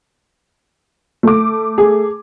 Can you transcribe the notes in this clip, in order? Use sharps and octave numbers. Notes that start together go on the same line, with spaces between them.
A3 D6
G#4